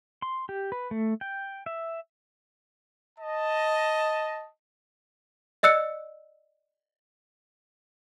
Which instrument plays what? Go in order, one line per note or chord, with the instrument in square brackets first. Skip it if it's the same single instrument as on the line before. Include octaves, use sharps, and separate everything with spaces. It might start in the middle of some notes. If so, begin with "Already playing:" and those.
[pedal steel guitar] C6
G4
B4
A3
G5
E5
[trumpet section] D#5 A5
[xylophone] D5 D#5 E6 F#6 C#7